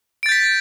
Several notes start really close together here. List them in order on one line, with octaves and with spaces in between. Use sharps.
D7 A6 G6 B6